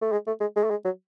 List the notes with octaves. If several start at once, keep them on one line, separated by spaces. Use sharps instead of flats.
A3
G#3
A3
G#3
G#3
A3
G#3
F#3